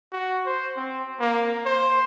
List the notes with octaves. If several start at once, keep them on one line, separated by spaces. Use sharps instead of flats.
F#4
C5
C4
A#3
C5